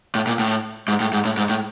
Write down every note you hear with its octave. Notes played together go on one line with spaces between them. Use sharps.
A2
A#2
A2
G#2
A2
G#2
A2
G#2
A2